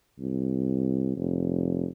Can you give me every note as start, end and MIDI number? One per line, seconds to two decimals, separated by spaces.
0.19 1.15 36
1.16 1.86 29